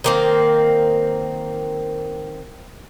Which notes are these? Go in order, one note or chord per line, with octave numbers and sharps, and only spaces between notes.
D#3 A#3 C4